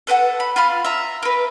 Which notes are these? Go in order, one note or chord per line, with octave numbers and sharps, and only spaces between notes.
A4 B4 C5 F#5
B5
F4 F5 B5 F6
E5 A#5
A#4 B4